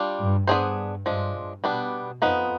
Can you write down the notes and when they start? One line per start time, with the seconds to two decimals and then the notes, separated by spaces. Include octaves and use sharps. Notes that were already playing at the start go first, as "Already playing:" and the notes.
Already playing: G3 D4 F4
0.18 G2
0.47 G2 B3 D4 G#4 C5
1.06 G2 F3 G#3 D4
1.35 G2
1.64 B2 G3 B3 D4
2.22 F2 F3 B3 D#4 B4